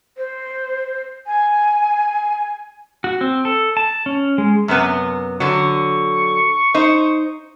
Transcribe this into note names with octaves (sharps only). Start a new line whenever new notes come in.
C5
G#5
F#4
C4
A4
A5
C#4
G#3
F#2 C3 B3
D3 F#3 C#6
D#4 C5